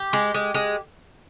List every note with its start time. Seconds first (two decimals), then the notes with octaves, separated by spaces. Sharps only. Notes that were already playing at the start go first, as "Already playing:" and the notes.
Already playing: G4
0.13 G#3
0.34 G#3
0.54 G#3